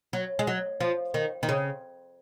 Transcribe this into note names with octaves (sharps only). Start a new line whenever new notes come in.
F#3
G#3
F#3
F3
D#3
D#3
C#3